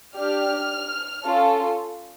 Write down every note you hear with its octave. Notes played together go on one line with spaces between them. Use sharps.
D4 G4 F6
C#4 F4 A4